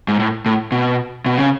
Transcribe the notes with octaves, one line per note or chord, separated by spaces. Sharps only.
G#2
A2
A2
B2
B2
C#3